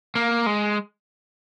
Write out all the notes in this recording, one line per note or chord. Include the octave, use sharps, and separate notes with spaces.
A#3
G#3